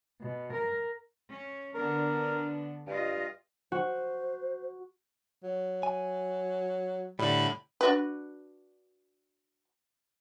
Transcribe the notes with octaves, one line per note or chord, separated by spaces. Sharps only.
B2
A#4
C#4
D3 B3 D4 A#4
G2 F4 D#5
F#4 C5
F#3
G#5
A2 D3 G3 B5
D4 F#4 B4